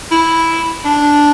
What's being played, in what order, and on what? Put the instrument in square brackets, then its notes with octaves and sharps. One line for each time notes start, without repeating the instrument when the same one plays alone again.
[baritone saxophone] E4
D4